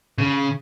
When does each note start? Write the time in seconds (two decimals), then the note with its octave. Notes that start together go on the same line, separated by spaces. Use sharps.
0.18 C#3